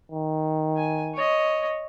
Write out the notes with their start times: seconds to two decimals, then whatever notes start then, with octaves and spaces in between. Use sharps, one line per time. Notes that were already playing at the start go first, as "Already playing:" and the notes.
0.12 D#3
0.77 G#5
1.15 C#5 D#5